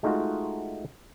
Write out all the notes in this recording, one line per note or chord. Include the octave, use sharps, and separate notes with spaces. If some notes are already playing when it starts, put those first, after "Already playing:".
G#3 A3 D#4 F4 F#4